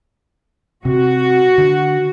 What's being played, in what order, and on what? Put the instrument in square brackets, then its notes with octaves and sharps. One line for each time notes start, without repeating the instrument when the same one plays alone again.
[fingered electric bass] C3 [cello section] F#4
[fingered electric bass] D3